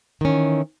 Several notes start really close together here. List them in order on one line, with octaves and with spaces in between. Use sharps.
D#3 C#4 E3